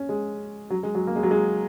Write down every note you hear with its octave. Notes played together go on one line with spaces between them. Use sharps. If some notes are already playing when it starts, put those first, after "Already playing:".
Already playing: C#4
G#3
F#3
G#3
F#3
A#3
G#3
F#3
G#3